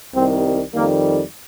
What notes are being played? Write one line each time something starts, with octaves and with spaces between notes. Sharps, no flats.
C2 C3 D#3 G3 C4
F2 D#3 G3 A#3